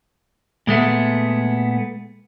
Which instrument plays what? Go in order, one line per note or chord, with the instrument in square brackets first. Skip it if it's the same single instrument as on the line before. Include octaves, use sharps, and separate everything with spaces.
[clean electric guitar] A#2 G#3 A3 B3